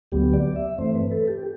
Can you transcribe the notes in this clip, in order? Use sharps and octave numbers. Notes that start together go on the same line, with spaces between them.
D2 D3 F#3 B3 G4
D5
E5
G2 E3 A3 C4 C5
B4
A4
G4